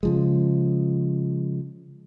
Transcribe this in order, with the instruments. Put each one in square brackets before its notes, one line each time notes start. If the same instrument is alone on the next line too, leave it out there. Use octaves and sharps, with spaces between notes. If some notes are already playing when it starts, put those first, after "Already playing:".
[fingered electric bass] C#3 F3 G#3